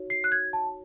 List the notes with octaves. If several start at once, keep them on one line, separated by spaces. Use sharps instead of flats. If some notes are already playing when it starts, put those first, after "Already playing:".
Already playing: D#4 F#4 C#5
C7
F#6
G#6
A5